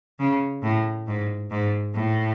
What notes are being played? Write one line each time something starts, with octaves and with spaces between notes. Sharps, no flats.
C#3
A2
G#2
G#2
A2